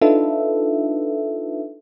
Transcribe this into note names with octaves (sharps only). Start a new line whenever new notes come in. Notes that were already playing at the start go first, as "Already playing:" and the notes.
D4 D#4 F4 A4 B4 E5